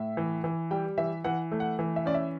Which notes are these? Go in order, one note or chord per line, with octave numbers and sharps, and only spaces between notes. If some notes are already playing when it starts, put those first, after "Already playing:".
Already playing: A2 E5
E3
E3
G3 G5
E3 E5
E3 F#5
A3
F#5
E3
E5
C#4 D5
E5